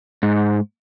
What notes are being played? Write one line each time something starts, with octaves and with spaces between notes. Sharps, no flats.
G#2